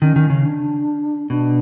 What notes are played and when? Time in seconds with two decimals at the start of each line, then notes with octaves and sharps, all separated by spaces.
0.01 D#3 C#4
0.16 D#3
0.30 C#3
0.45 D4
1.30 B2 D4